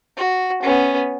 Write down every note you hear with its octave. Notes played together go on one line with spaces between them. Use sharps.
F#4
B3 C#4